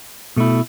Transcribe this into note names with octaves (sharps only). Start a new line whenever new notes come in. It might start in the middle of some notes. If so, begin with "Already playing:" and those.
B2 A3 E4